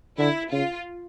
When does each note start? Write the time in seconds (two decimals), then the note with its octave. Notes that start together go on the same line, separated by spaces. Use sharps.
0.19 D3 E4
0.52 C#3 F4